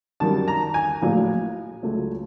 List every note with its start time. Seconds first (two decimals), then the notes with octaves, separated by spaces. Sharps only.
0.20 F#2 D#3 G3 A5
0.48 A#5
0.74 G#5
1.02 A#1 A2 F#3
1.83 C#2 C#3 F#3 A3